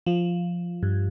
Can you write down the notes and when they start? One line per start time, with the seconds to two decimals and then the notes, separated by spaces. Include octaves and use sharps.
0.06 F3
0.83 G2